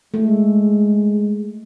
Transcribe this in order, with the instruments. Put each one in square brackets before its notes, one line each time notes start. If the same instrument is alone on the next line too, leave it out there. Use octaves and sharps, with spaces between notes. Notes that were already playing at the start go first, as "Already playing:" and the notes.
[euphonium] G#3 [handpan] A3